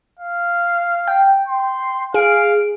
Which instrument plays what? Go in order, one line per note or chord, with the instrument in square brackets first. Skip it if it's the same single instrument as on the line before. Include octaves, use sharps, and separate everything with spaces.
[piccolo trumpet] F5
[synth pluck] G5
[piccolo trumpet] C6
[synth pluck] G#4 D7 [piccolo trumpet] F5